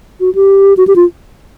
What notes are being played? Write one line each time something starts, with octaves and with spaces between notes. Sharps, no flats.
F#4
G4
F#4
G4
F4